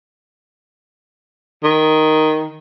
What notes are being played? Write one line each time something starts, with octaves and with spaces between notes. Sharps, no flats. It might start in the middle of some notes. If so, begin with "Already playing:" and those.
D#3